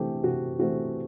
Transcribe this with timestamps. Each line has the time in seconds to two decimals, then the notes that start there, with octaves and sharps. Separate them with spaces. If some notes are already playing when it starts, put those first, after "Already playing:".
Already playing: C3 E3 A3 C4 G4 A4
0.24 C3 F#4
0.59 E3 A3 C4 F#4